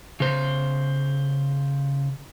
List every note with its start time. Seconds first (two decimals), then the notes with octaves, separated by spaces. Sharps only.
0.20 C#3 C5